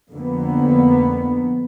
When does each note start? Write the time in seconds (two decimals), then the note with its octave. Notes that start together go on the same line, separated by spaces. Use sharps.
0.12 F2 D3 A#3 B3